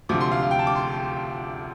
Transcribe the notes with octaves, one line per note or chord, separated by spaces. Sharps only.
D2 C3 F3 D6
C6
F5
F5
G5
A5
D6
C6